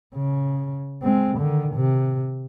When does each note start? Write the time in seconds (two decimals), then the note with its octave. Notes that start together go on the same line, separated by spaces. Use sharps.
0.15 C#3
1.02 G#3 C4
1.38 D3 D#3
1.75 C3